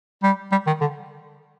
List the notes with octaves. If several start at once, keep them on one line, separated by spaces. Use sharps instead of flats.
G3
G3
D#3
D3